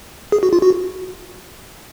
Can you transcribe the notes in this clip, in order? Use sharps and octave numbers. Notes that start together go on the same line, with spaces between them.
G#4
F#4
F4
F#4